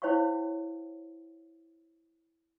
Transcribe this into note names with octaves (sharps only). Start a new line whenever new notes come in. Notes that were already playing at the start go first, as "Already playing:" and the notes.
E4 C5 C#5 F5 G5 C#6